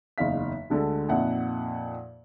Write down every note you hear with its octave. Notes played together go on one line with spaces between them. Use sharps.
F#1 E2 D#4 F5 B6
D2 D3 G#3 A4
F2 A#2 D#4 E5 F#5